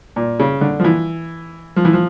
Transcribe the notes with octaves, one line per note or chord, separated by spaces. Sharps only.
A#2
C#3
D3
F3
E3
F3
E3
F3